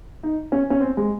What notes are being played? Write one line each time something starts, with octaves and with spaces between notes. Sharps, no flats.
D#4
C#4
C#4
C4
G#3